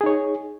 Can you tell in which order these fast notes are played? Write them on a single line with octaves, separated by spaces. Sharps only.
G#4 D#4 C#5